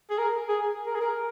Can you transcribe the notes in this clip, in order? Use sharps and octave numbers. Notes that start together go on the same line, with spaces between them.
G#4
A#4
G#4
A#4
G#4
A#4